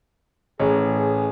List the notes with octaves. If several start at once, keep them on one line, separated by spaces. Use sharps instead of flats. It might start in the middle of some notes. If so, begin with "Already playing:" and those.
A1 G#4 C#5